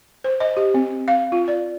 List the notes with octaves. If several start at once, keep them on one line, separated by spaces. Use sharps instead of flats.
C5
D#5
G4
C4
F5
F4
D5